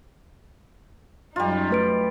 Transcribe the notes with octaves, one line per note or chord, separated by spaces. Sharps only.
F#2 G3 D#4 F4
A3 B4 D7